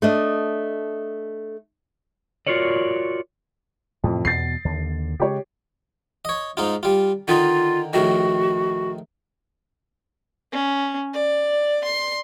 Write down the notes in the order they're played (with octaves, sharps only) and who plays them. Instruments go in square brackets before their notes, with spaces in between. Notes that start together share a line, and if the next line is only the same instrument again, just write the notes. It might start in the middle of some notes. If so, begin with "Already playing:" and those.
[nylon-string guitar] A3 D4 D#5
[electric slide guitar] F4 F#4 A#4 C#5 D5
[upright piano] F2 [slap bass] A2 C3 E3
[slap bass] E2 B2 [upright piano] A6 C7
[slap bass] D#2 D3
[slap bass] C#3 G#3 [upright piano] G4 C#5
[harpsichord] C#5 D#5
G#2 D#4 F4
G3 F4
[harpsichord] D3 D#3 D#4 [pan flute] F4
[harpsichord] A#1 A2 D#3 [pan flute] F#4
[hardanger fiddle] C#4
D5
C6